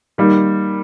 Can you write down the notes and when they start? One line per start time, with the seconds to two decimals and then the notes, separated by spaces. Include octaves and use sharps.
0.18 D#3 G3 A#3